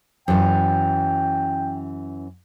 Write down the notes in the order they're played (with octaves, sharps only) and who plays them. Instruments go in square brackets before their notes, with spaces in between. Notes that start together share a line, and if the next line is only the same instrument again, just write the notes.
[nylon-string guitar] F#2 E3 [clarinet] G5